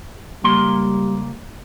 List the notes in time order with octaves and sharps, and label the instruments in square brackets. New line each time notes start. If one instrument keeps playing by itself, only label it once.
[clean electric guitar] C#2 A#3 C6 [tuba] G3